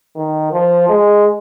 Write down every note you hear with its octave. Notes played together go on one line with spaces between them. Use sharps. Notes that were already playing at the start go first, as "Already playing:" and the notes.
D#3
F3
G#3